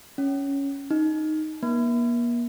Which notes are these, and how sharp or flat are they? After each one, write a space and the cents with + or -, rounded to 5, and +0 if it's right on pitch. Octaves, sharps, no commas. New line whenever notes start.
C#4 +5
D#4 +0
A#3 +40